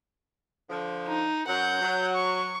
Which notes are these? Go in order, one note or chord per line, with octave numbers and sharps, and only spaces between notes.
D3 F3
D#4
F#2 F#3 F#5 G6
F#3
C#6